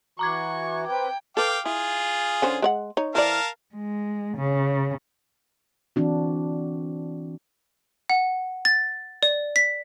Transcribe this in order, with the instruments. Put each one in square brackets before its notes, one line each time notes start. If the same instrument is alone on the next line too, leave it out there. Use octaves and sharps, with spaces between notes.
[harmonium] E3 F#4 [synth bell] A#5 D6 G#6 [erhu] C#6
[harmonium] C4 B4 [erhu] G5
[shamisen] A4 B4 [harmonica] F5 G5 D6
[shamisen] E4 [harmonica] F4 G#4
[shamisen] D3 C#4 C5
G#3 C#5 F#5
D#4 C#5
[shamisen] E3 C5 D5 [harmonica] A#4 F5 A5
[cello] G#3
C#3
[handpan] E3 C4 D4 F#4
[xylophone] F#5
A6
D5
B6